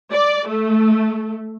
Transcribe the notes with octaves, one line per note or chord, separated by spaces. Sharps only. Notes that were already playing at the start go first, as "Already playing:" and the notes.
D5
A3